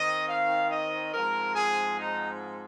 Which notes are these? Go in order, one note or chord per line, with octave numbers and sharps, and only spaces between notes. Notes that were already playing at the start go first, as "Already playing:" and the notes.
Already playing: D#3 C4 D#5
F5
D#5
G#2 F3 C4 A#4
G#4
D#4